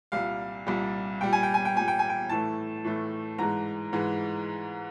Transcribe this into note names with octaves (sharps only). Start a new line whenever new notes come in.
C2 A#2 G3 F5
C2 A#2 G3
A#2 G3 G5
G#5
G5
G#5
G5
A#2 G3 G#5
G5
G#5
G5
A2 E3 A3 A5
A2 E3 A3
G#2 E3 G#3 A#5
G#2 E3 G#3